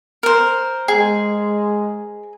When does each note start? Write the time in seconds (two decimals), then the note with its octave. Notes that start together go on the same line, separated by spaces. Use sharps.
0.23 A#4 C5
0.88 G#3 G#4